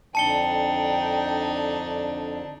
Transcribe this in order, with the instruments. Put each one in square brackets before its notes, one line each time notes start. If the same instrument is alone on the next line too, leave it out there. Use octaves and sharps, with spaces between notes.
[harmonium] F2 D3 [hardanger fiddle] D4 D#4 [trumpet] G5 [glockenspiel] A5 C#7 G7